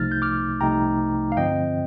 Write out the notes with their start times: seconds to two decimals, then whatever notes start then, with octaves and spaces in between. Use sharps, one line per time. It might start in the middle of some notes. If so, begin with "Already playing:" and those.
Already playing: C2 C3 F3 A3 D#4 F6 A6
0.11 G6
0.22 D6 F6
0.60 C2 C3 F3 A3 D#4 G5 A#5
1.32 F5
1.37 G2 D3 F3 C4 D#5 G5